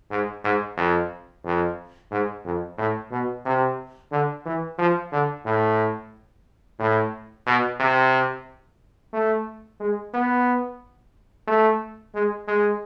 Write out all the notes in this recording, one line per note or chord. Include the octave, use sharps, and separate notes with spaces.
G#2
G#2
F2
F2
G#2
F2
A2
B2
C3
D3
E3
F3
D3
A2
A2
B2
C3
A3
G#3
B3
A3
G#3
G#3